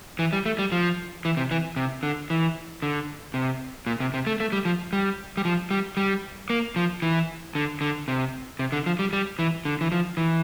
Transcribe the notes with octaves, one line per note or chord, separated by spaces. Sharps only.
E3
G3
A3
G3
F3
E3
C3
E3
C3
D3
E3
D3
C3
A#2
C3
C3
A3
A3
G3
F3
G3
G3
F3
G3
G3
A#3
F3
E3
D3
D3
C3
C3
D3
F3
G3
G3
E3
D3
E3
F3
E3